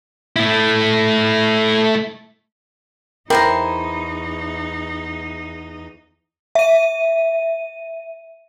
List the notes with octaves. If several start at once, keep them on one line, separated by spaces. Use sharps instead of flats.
A3 E4
E2 D#4 E4 A#4 C5 G5 A#5
E5 D#7